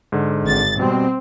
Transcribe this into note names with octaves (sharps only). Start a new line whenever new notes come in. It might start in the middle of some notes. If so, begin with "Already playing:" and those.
G#2 D3
G#1 A6
B2 G3 C4